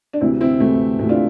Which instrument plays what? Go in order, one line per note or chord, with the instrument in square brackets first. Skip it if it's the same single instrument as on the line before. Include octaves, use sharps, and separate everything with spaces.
[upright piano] D4
D2 C3 E3 C4 E4
C4 E4
D2 C3 E3 A3
D2 A3
C3 E3
D4 F4